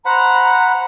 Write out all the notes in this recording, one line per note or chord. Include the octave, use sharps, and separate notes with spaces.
C5 F#5 A#5 B5